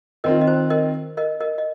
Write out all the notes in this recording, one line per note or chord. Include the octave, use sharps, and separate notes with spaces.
D#3 C4 F4 A#4 D#5
D#5
C5
A#4 D#5
A#4 D#5
A#4 D#5
D#5